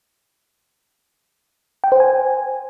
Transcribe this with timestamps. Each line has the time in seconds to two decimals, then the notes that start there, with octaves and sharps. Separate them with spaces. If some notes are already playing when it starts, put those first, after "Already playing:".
1.84 G5
1.92 C5
2.00 G#5